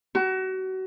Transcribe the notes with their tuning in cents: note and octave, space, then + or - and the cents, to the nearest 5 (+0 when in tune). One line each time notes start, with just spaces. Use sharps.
F#4 +30